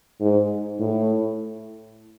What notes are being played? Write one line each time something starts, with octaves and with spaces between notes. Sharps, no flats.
G#2
A2